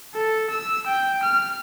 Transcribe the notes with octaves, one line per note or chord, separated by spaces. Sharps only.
A4
E6
G5
F6